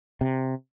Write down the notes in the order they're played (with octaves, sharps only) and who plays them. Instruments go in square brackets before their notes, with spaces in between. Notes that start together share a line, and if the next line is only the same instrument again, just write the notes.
[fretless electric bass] C3